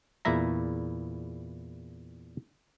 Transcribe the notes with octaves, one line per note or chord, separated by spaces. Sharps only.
E2 A#2 E4 E5 A#5